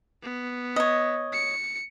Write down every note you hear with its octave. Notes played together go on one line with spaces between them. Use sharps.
B3
C#5 D#5
C#7